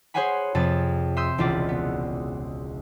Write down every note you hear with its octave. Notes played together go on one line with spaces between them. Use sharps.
G#4 C5 C#5 F#5 G#5 B5
F2 C3 G#4 A5 A6
E5 C6 D#6 E6 G6
E1 C#2 E4 F4 D5
B3